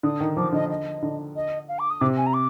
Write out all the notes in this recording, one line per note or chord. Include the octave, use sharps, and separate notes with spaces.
D3 D#6
D#3
F3 D6
D3 D#5
D#5
D3
D#5
F5
D6
D#6
C3 D6
G#5
A#5
D6